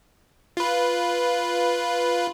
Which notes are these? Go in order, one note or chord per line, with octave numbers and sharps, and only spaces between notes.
F4 B4